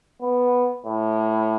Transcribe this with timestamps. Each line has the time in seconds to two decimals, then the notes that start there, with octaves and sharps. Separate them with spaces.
0.21 B3
0.86 A2